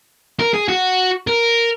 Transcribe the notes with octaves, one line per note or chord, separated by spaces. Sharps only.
A#4
G#4
F#4
A#4